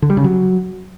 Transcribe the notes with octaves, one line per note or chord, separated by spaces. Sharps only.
D3
G3
C#3
F#3